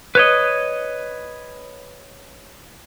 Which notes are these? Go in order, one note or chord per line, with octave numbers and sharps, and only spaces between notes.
B4 C#5 D#5